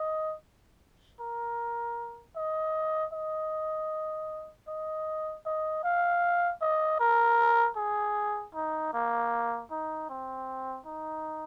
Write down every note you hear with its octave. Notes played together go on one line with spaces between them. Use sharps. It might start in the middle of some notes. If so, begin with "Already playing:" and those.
Already playing: D#5
A#4
D#5
D#5
D#5
D#5
F5
D#5
A#4
G#4
D#4
A#3
D#4
C4
D#4